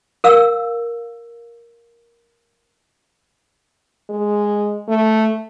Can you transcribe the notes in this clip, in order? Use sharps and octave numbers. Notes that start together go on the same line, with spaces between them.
A#4 F5 E6
G#3
A3